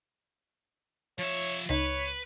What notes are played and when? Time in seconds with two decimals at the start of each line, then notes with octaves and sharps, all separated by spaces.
1.19 F3 C#5 E5
1.69 C#2 D#4 B4 C#5